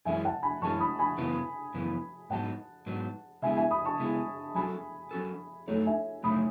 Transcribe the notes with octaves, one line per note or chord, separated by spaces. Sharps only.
F#2 E3 G#3 C#4 E5 G#5
F#5 A5
G#5 B5
F#2 E3 G#3 C#4 A5 C#6
B5 D#6
G#5 B5
F#2 C#3 E3 B3
F#2 C#3 E3 B3
G#2 F#3 B3 D#4 F#5 A5
G#2 F#3 B3 D#4
C#3 G#3 B3 E4 G#4 E5 G#5
E5 G#5
B5 D#6
A5 C#6
C#3 G#3 B3 E4 G#4
F#3 C#4 F#4 A4 G#5 B5
F#3 C#4 F#4 A4
F#2 C#3 F#3 A3 D#4 A4 C#5
E5 G#5
F#2 C#3 F#3 A3 D#4 B5 D#6